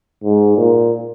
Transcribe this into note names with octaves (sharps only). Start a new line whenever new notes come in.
G#2
A#2